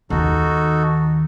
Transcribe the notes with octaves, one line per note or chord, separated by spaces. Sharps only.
D#2 D#3 D#4 F#4 A4